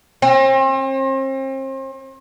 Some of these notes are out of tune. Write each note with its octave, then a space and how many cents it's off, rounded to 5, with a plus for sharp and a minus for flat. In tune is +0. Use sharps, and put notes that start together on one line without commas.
C4 +40